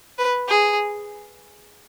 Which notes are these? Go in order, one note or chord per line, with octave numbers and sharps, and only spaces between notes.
B4
G#4